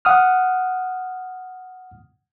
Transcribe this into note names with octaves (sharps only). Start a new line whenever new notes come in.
F#5 D#6 F6